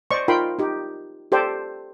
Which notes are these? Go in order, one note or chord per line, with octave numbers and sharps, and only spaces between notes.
C5 D5 D#5 C#6
D#4 F4 A#4 G5 B5 C6
D#4 G4
G4 A4 C5 D5 G5